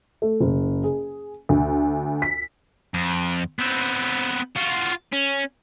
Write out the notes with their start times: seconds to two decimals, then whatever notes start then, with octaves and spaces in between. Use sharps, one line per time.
0.22 A3
0.40 F#1
0.84 G#4
1.49 D2
2.22 B6
2.94 F2
3.59 B3 C4
4.56 F4 F#4
5.12 C#4